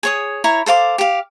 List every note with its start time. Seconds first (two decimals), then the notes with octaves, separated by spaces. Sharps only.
0.03 G#4 C#5 D#6
0.44 E4 C#5 A#5
0.66 A4 C5 F5 D6
0.98 G4 F5